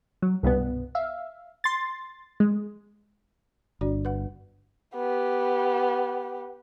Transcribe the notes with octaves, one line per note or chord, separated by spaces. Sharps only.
F#3
C2 G2 B2 B3
E5 F5
C6 A6
G#3
G1 D4 F#4 D5
B4 F#5
B3 G4